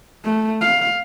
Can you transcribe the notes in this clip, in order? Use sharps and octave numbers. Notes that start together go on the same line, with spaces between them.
A3
F5